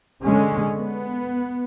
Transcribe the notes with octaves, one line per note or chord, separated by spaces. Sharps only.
D3 G#3 C#4
B3